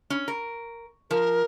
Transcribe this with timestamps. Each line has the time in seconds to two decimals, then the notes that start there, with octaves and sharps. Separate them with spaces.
0.10 C#4
0.28 A#4
1.11 F3 A#4